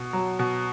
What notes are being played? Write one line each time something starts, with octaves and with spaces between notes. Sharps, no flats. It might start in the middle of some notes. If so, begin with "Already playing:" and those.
Already playing: B2
F#3
B2